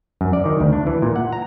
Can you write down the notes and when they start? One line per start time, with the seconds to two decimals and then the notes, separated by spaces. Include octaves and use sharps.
0.21 F#2
0.33 D5
0.46 D#3
0.60 D2
0.73 D4
0.87 E3
1.02 A#2
1.16 F#5
1.33 A#5